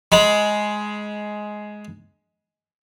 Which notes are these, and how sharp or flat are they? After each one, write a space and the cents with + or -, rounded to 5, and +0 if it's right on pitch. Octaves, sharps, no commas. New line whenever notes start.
G#3 +10 B5 -25